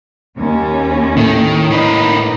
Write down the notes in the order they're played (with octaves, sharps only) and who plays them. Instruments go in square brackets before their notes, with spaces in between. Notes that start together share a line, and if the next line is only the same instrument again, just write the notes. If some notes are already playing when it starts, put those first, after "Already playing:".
[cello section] D#2 C#4
[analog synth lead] A2 [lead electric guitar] D#3
[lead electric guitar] A#3 B4 [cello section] D#4